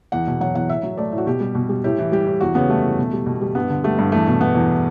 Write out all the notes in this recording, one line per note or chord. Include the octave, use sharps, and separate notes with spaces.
E2 F#5
B2
F#3 F#5
E2 F#5
A2 E5
F#3
A3 D5
A2
F#4
B2 G4
G3
B2
G3
A2 G4
E3
G3 G4
A2
E2 F#4
C#3 B3
G3 A3
E2
B2
G3
B2
G3
G2 B3
D3
G3 A3
G2
E2 A3
B2
A3 B3
E2